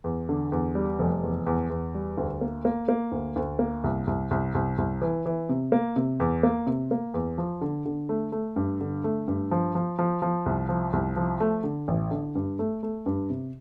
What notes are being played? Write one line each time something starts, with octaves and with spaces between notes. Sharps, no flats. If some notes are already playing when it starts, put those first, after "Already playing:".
E2
D3
E2
G3
F1
E2
E2
E2
G3
D2
A#3
A#3
A#3
D2
D2
A#3
C2
C2
C2
C2
C2
E3
E3
C3
A#3
C3
E2
A#3
C3
A#3
E2
F3
D3
D3
A3
A3
G2
D3
A3
G2
F3
F3
F3
F3
C2
F3
C2
F3
A3
D3
A1
D3
G2
A3
A3
G2
C3